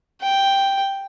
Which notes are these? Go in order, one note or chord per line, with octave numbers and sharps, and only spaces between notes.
G5